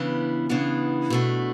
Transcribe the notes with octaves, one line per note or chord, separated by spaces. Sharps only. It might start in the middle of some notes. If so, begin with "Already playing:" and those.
Already playing: C#3 E3 B3 D4
C#3 E3 B3 D4
B2 A3 D4